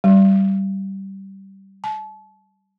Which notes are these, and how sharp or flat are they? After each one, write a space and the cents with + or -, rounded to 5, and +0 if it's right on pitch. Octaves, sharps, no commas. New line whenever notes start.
G3 -15
A5 -35